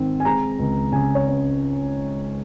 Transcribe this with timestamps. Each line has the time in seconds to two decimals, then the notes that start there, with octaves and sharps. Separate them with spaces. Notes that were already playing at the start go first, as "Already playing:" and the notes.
Already playing: G#2 D#3 C4
0.20 G#5
0.25 G#3 A#5
0.59 C#2
0.92 C#3 G#5
1.15 C#5
1.27 C#4